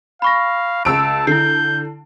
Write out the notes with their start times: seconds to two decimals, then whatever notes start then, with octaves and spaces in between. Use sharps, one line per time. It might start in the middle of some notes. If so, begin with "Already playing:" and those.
0.22 F5 B5 C#6 A#6
0.85 C#2 A5 E6 D7
1.27 D3 E4 G6 C7